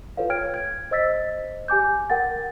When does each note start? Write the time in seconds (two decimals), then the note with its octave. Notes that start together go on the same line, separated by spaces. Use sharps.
0.17 F4 A4 B4 C#5 F5
0.30 C#5 G5 F6 G#6 D7
0.54 G#6
0.91 C5 D#5 E6 A6 B6
1.68 G4 G#5 D6 G6
2.10 A#4 F#5 G5 A6